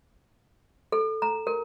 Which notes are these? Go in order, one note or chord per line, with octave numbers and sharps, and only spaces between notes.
A4
A#5
A#4